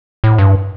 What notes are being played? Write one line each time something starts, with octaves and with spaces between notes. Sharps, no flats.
A2
G2